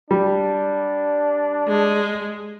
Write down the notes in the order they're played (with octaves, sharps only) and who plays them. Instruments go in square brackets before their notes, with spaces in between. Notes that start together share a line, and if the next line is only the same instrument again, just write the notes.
[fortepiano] G3 [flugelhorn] D4
[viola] G#3